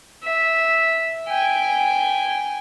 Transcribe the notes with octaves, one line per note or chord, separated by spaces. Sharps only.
E5
G5 G#5